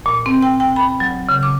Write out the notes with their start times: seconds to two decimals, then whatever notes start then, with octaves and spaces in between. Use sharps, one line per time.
0.06 A#2
0.26 C4
0.42 G5
0.60 G5
0.76 B5
1.00 F#3
1.29 C#3
1.43 D6